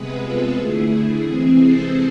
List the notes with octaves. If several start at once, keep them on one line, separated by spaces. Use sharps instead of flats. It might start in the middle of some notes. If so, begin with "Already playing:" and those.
Already playing: C3 G#3 B3 G#4 B4
F4 A4
D3 A3 E4 G#4
C3 E3 G#3 C4 G#4
A4 C5